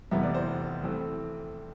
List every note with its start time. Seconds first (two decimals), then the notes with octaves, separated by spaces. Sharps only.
0.11 F1 E2 C3 E3 B3 E5
0.23 D5
0.35 C5
0.84 E3 A3 C4